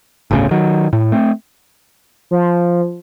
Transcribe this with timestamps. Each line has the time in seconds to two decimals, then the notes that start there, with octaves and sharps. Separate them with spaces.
0.31 G1 D2 A2 C#3
0.51 D#3 F#3
0.93 A2
1.12 A3 C4
2.31 F3